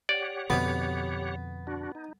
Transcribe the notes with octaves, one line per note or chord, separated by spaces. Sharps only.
G4 C#5 D5 F#5
F2 B2 D3 B3
D4 F#4
D#4